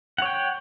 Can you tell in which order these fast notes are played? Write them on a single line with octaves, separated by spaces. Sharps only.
F#5 C#5 G5